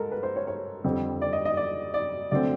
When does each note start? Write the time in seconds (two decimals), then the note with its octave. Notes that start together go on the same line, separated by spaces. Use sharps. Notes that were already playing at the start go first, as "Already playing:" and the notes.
Already playing: G#2 A4 A#4
0.11 B4
0.23 C5
0.36 C#5
0.47 C#5
0.84 F2 D3 G3 C4
1.22 D5
1.33 D#5
1.45 D#5
1.57 D5
1.94 D5
2.31 D3 F#3 A3 C4 D5